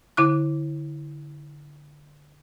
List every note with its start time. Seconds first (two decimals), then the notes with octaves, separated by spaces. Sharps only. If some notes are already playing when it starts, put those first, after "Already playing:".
0.17 D3 E4 D6 F#6